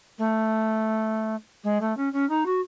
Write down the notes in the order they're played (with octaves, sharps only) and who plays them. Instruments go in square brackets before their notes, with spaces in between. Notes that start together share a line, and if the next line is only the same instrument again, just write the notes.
[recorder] A3
G#3
A3
C#4
C#4
D#4
F#4